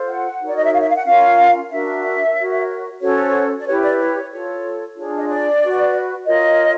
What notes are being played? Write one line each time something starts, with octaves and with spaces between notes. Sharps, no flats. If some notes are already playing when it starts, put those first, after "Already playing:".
Already playing: F4 A4 C5
F#5
D#4 F#4 A#4 C#5
D5
D#5
E5
F5
E5
F5
F#5
C#4 F4 A#4 F5
D4 F#4 A#4 E5
F#4 A#4 C#5
C#4 F#4 A4 C5 C#5
D5
E4 G4 B4 C#5
D5
C#5
F4 A4 C#5
D4 F4 G#4 C#5
D#5
D5
F#4 B4
F4 A#4 C#5 D#5